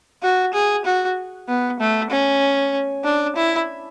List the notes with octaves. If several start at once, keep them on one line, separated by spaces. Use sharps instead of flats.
F#4
G#4
F#4
B3
A3
C#4
D4
E4